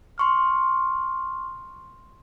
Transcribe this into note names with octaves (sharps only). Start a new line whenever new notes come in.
C6 C#6 F6